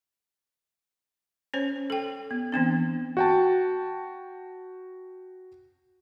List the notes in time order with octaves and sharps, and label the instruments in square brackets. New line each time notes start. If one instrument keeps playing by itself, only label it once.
[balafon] C#4 C5 C#5
A4 G5
B3
E3 B3 C4 D4
[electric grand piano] F#4 G5 A5